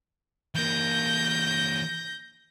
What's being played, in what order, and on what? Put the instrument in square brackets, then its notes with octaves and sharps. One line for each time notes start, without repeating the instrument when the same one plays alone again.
[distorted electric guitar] E3 A#3 [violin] G6 A#6